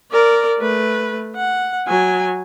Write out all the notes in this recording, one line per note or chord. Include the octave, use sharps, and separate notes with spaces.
A#4 D5
A3 B4
F#5
F#3 G#5